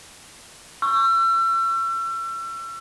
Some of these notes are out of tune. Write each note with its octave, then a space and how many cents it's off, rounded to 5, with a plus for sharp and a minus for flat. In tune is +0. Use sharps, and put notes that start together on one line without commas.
C#6 +0 E6 +35